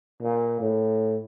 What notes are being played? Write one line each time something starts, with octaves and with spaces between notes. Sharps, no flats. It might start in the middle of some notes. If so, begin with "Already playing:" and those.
A#2
A2